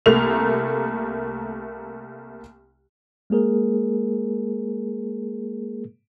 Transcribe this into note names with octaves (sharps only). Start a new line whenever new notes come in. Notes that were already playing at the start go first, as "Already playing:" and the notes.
C2 A3 A#3 F7
G#3 A#3 G#4 A#4